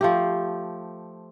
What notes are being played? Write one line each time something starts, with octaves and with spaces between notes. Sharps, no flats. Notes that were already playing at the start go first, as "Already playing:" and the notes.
F3 A3 G4